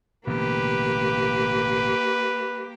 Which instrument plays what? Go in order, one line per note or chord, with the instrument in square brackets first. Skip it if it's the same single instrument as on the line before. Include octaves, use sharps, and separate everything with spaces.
[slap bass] A1 B2 D3 [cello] A#3 G4 [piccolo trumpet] B4